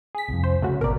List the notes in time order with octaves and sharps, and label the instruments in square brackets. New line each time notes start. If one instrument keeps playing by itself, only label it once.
[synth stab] G#4 B6
[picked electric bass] C2 F2
[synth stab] C5
[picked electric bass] C#3 [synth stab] A3 C#4 F#4
[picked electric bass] G#1 B2 [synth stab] A#4 D5